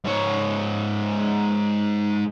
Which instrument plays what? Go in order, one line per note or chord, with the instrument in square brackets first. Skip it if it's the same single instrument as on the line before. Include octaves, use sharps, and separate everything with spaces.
[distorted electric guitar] G#2 C#5